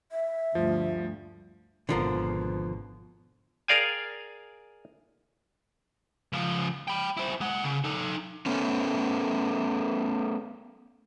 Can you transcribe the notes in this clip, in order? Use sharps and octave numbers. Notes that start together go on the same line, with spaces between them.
E5
D2 G2 F3
G#1 B2 D3 F3 A#4
G#4 A#4 D5 F5 G5 G#5
C#2 F3
G5 B5
E4 C5
G#3 F#5
C#3
D#4 A4
A3 B3 C#4